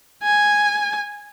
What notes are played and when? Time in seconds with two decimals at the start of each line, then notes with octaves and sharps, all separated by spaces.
0.24 G#5